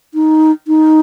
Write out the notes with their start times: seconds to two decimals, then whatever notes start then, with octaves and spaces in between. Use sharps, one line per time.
0.14 D#4
0.67 D#4